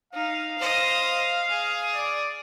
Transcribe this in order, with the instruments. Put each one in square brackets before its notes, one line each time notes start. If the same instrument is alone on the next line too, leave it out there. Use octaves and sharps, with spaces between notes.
[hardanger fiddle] D#4 [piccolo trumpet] F5
[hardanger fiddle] C5 D#5
G#4
[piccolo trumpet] D5